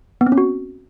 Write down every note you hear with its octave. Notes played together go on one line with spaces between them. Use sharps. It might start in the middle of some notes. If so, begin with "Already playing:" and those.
B3
C4
C#4
F#4